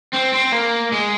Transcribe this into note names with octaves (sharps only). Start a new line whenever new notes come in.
C4
C4
A#3
G#3